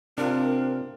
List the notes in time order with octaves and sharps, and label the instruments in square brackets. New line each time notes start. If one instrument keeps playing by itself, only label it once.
[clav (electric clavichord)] C3 F4 [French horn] C4 [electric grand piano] D4 [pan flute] A#4